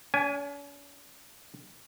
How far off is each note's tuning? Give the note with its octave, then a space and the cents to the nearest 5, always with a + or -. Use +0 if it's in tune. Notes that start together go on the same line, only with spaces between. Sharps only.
C#4 +45 G#5 +0